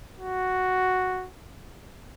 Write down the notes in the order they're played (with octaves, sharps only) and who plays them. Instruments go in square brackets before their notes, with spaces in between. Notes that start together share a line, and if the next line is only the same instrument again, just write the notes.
[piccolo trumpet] F#4